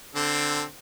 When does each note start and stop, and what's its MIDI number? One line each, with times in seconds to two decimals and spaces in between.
0.15 0.63 50
0.15 0.63 60
0.15 0.63 69